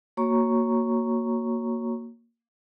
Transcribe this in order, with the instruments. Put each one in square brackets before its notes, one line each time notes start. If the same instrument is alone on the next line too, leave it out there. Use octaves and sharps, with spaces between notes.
[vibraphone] A#3 F#4 C#5 A#5 C#6